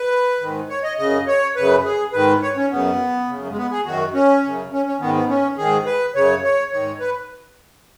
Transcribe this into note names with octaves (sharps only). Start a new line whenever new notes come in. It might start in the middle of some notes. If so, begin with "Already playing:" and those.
Already playing: B4
G#2 D#3
C#5
D#5
F#2 C#3 D#5
C#5
F#2 C#3 B4
G#4
G#2 D#3 B4
C#5
C#4
F#2 C#3 B3
F#2 C#3
G#3
B3
G#4
F#2 D#3 F#4
C#4
F#2 C#3
C#4
C#4
G#2 D#3 B3
B3
C#4
G#2 D#3 G#4
B4
F#2 C#3 C#5
C#5
G#2 D#3 C#5
B4